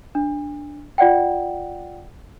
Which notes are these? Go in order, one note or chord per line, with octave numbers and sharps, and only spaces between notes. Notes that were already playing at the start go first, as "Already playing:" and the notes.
D4
F4 D5 F#5 G5